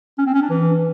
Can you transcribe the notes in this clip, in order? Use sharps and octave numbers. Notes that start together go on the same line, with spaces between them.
C#4
C4
C#4
D4
E3